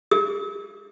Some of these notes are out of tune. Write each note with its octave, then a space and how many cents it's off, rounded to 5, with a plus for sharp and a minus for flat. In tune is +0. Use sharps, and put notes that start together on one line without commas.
G#4 -45 E6 -45